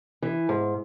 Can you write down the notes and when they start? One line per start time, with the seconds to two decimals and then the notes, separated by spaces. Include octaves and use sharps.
0.22 E3
0.49 G#2